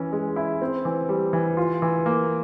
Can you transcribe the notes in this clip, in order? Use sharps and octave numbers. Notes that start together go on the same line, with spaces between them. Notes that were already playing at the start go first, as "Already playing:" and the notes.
Already playing: E3 C#4
G#3
E4
C4
E3
G3
E3
F4
E3
A#3